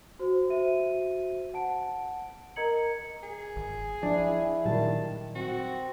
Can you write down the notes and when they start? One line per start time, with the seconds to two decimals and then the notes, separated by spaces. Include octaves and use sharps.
0.19 F#4 C5
0.49 F#4 C5 E5 D#7
1.54 F#5 A5 D7
2.56 A#4 D#5 A#5 G#6 C#7 F#7
3.23 G#4
3.56 G#1
4.03 F3 D4 E4
4.65 A#2 D#3 F#3 G3 A5
5.35 C4 F#4